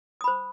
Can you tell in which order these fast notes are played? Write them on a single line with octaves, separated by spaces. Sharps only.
D#6 B5 C5